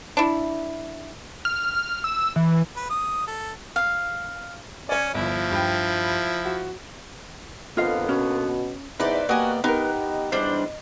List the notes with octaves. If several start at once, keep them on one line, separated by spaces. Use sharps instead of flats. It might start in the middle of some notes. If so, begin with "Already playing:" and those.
D4 E4
F6
E6
E3
B4
D#6
A4
F5
C#4 C#5 D5
G1 F3 E4
G2 G5
F#4
F2 D3 A#3 B3 F4 D#5 F5
B2 C#4
E2 D#4 B4 C5 D5 E5
A#3 B3 F#4 G4 D5 D#5 G#5
B3 D#4 G4 A#4 B4
D#5
E2 G3 D4 C5